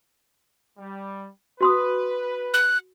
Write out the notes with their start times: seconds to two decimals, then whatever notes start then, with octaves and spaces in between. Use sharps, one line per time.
0.79 G3
1.61 F#4 B4 C6 D#6
2.54 F#6